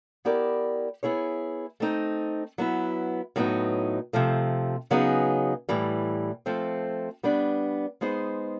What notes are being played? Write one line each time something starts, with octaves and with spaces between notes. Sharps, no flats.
B3 E4 G4 A#4 D5
B3 E4 G#4 C#5
A3 C4 D#4
F#3 B3 E4
A2 F#3 B3 D#4
C3 F3 A3
C#3 F#3 B3 D#4 G#4
A2 E3 G3
F3 A3 C4
G3 B3 D4
G#3 B3 D#4 G#4 C5